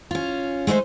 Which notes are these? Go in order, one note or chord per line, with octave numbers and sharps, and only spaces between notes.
C#4 F4
G#3 A3 D#4 E4 C5